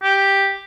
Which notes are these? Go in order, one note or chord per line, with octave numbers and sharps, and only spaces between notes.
G4